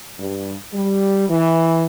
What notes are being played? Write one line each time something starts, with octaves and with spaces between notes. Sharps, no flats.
G2
G3
E3